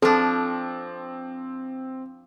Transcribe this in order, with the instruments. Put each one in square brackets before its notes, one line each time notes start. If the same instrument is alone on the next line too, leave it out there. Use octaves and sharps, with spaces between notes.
[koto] F3 D4 [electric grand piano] C4 [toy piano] A4